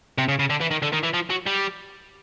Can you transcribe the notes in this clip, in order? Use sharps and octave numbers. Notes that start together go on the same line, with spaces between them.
C3
C#3
C#3
D3
E3
D#3
D3
D#3
E3
F3
F#3
G3